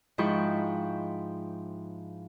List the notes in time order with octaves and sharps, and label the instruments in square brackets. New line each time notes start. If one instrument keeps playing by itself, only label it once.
[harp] G#2 F3 E4 G5 C#6